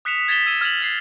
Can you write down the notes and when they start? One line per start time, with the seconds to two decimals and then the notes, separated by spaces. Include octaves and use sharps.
0.05 D#6 F#6 B6 C#7 E7 F7
0.28 G#6 A6 B6 E7 G7
0.46 E6 G#6 B6 D#7 E7 G7
0.61 F6 G#6 A6 B6 F7 F#7
0.82 A6 C7